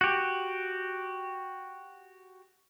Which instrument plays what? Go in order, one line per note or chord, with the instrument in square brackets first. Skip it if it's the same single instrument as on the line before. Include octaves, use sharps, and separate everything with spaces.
[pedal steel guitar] F#4 G4